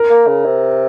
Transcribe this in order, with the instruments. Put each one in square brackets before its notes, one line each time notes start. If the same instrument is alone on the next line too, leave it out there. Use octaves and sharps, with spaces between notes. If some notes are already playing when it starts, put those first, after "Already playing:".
Already playing: [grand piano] A#4
[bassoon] A#3
C#3
C3